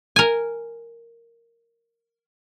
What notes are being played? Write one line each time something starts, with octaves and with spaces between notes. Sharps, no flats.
A#4 G#5